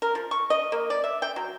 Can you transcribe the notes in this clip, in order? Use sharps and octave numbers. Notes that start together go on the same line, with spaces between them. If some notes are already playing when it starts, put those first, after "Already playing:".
A#4
F3
C#6
D#5
A#3
D5
E5
G5
F#3